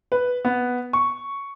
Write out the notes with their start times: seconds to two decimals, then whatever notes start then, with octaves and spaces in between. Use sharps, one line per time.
0.12 B4
0.45 B3
0.93 C#6